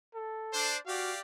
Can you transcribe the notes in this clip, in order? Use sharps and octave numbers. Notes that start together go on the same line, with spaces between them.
A4
D4 C5
F#4 G4 D5 F5